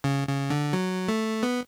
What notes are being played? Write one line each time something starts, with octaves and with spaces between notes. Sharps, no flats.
C#3
C#3
D3
F#3
A3
B3